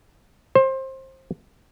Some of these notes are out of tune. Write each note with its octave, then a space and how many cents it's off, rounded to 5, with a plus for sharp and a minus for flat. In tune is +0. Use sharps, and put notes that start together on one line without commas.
C5 +25